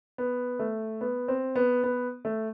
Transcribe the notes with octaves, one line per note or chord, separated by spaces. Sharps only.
B3
A3
B3
C4
B3
B3
A3